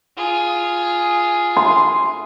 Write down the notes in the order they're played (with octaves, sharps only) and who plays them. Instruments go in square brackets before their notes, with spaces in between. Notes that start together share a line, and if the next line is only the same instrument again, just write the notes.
[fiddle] F4 G#4
[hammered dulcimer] C6